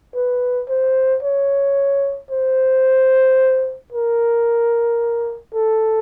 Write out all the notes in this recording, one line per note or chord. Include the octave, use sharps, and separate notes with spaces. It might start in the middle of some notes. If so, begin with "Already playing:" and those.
B4
C5
C#5
C5
A#4
A4